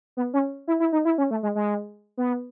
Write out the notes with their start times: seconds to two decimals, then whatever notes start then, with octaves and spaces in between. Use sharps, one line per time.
0.17 B3
0.34 C#4
0.68 E4
0.80 E4
0.93 D#4
1.05 E4
1.18 C#4
1.31 A3
1.43 G#3
1.55 G#3
2.17 B3